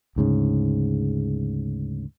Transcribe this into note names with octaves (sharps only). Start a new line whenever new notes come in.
D2 G#2 C#3